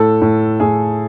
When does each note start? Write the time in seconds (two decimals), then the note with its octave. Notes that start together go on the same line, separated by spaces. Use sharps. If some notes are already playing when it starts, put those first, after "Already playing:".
Already playing: A2 A4
0.21 A2
0.60 A2 G#4